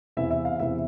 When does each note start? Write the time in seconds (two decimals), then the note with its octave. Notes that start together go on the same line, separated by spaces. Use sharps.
0.17 E2 C3 E3 E5
0.31 E5
0.45 F5
0.59 E2 C3 E3 E5